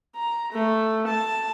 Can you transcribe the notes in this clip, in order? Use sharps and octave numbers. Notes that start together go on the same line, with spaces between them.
A#5
A3
A5